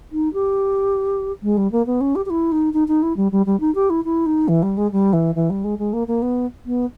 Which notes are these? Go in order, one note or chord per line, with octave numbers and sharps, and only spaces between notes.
D#4
G4
G#3
G3
A#3
B3
C#4
G4
G4
E4
D#4
D#4
D#4
E4
G3
G3
G3
D#4
G4
E4
E4
D#4
E3
G3
G#3
G3
E3
E3
G3
G#3
G#3
A#3
A#3
B3
B3